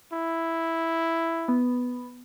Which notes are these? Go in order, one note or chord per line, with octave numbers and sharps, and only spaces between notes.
E4
B3